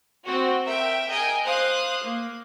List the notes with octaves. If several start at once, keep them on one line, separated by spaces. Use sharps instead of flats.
C4 F#4
A#4 E5 G5
G#4 A#4 D#5 G5 G#5
C5 F5 D#6 F#6
A#3